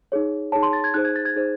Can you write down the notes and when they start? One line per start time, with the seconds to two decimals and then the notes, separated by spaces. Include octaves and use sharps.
0.12 D#4 G#4 C#5
0.52 D#4 G#4 C#5 A5
0.63 C6
0.73 A6
0.84 G#6
0.94 D#4 G#4 C5 F#6
1.05 G#6
1.16 A6
1.25 G#6
1.36 D#4 G#4 C5